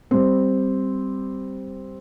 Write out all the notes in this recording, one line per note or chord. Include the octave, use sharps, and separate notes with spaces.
G3 C4